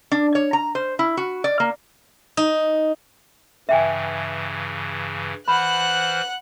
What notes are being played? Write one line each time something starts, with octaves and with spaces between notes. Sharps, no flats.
D4
C#5
A#5
C5
E4
F#4
D5
A#3
D#4
G2 C#3 E3 E5 G5 G#5
E3 C5 F#5 B5 F6 F#6